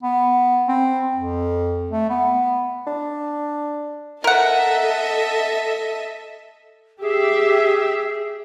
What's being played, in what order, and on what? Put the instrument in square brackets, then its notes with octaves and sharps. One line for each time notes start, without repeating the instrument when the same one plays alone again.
[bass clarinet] B3
C4
F2
A3
B3
[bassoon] D4
[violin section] A4 D#5 E5 [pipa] A#4 F#5
[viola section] G4 E5 [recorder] G#4